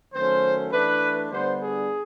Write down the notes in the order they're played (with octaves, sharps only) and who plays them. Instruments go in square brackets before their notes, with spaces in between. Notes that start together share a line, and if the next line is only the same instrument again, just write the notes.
[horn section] D#3 F#3 A3 C#4 C5
E3 A3 D4 B4
D3 G3 B3 D4 C5
G#4